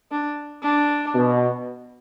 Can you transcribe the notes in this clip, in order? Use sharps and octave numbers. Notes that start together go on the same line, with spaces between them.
D4
D4
B2